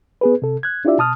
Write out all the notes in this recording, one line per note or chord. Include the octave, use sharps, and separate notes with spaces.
B3 G#4 B4
C3 A4
F#6 G#6
D4 E4 F4 G4 D5 E5
B2 A5 D#6 F6